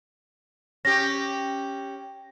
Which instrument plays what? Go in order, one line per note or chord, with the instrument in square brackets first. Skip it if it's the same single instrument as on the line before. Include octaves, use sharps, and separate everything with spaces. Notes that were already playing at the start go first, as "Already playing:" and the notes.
[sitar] C#4 G4 [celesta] A#6